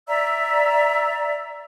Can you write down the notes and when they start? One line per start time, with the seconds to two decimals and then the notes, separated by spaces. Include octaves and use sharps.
0.08 D5 E5 A#5 E6